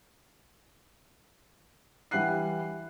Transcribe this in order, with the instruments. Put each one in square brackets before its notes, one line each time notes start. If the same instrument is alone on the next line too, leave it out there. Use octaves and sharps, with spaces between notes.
[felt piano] E3 G3 F#5 F#6 C7